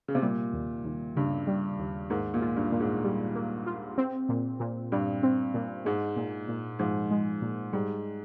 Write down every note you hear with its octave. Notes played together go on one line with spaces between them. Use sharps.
C#3
C3
A#2 G3
D#2
D#2
G2 C#3
G3
D#2
G#2 A#3
A#2
F4
G2
A#2
G#2
G3
A#3
F4
C4
A#2
A#2
G2 G3
C4
A#2
G#2 G#3
A#2
A#2
G#2 F3
G#3
A#2
G#2 G3